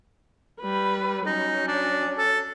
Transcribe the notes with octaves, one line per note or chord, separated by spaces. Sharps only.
G3 B4
F#3 C#4 D#4
D4
A4